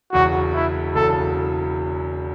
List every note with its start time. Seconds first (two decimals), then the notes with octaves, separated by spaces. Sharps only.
0.12 E1 E2 C#3 F#3 F#4
0.54 E4
0.95 E1 E2 C#3 F#3 A4